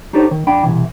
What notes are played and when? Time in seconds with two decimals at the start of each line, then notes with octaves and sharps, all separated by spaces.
0.13 D4 D#4 G4 A4 C5 C#5
0.31 D#3
0.47 F2 D4 G5 B5
0.63 C2 G2 B2 E3